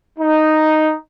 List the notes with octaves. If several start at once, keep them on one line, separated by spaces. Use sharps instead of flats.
D#4